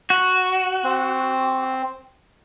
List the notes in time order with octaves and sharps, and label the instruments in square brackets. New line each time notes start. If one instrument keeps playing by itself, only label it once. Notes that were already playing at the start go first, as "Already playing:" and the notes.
[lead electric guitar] F#4
[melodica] C4